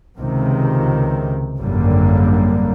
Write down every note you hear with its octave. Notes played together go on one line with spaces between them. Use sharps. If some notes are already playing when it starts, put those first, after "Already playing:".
C#2 C3 D#3
G#1 F#2 D3 G3 A#3